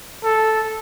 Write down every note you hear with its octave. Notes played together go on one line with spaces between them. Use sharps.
A4